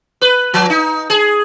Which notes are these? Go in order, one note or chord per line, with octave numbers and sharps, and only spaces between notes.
B4
F3
D#4
G#4